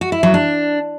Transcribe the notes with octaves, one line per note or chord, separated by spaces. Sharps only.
F#4
E4
F#3
D4